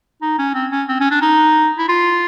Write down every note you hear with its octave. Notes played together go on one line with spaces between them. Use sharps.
D#4
C#4
C4
C#4
C4
C#4
D4
D#4
E4
F4